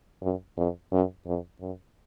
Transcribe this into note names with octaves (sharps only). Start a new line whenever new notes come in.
F#2
F2
F#2
F2
F#2